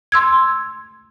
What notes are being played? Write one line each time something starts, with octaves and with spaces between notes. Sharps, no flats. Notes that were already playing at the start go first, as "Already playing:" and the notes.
C6 E6 G#6